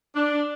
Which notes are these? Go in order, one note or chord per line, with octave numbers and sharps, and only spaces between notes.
D4